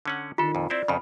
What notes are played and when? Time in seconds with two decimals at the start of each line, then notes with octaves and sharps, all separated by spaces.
0.06 D3 C#4 F#5
0.38 D#3 D4 F4 A4
0.55 F2 A#2
0.70 C4 E4 C5 D5
0.88 F2 C#3 B5